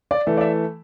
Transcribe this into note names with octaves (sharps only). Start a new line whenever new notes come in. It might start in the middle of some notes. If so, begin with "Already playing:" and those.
D5
E3 A3
D5
E5